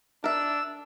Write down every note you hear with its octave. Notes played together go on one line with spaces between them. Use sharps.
D4 A#4 E5 E6